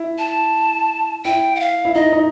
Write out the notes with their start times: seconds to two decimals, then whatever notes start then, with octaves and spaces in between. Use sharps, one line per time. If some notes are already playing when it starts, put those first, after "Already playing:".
Already playing: E4
0.19 A5
1.25 E4 G5
1.56 F#5
1.60 F5
1.85 E4
1.95 D#4 D#5
2.13 D#4